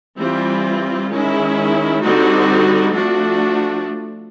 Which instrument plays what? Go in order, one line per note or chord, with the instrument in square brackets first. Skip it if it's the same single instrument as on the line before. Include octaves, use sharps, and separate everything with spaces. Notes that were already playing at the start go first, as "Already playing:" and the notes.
[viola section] E3 G3 C4 F4
D#3 G#3 C#4 E4
D3 G3 C4 D#4 F#4
F3 A3 D4 F#4